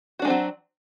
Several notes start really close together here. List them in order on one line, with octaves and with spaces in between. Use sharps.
F#4 D4 G#3 C4 F#3